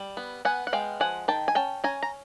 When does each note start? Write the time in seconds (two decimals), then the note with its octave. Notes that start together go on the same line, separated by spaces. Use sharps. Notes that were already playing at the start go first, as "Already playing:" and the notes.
Already playing: G3
0.17 B3
0.45 B3 F#5 G#5
0.67 F#5
0.73 G#3 F5 G5
1.00 F3 F#5 G#5
1.28 D#3 G5 A5
1.48 G#5
1.55 C#4 G5 A5
1.84 C#4 G#5 A#5
2.03 A#5